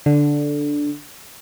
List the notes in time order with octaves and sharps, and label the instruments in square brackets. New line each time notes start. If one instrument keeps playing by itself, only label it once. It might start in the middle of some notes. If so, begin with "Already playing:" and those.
[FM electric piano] D3